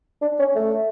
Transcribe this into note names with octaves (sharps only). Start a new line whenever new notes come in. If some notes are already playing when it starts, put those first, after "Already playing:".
D4
C#4
A3